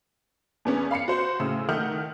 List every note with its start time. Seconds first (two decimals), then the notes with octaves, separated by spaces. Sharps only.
0.65 E2 B3 C#4
0.91 F5 B5 C7 C#7
1.08 F#4 C5
1.39 A2 C#3 E6
1.69 D#3 A3 F#5 D#6 F6 G6